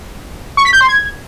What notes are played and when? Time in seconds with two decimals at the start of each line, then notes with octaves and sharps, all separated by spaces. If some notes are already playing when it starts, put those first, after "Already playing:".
0.57 C#6
0.65 B6
0.73 G6
0.81 C6
0.88 G#6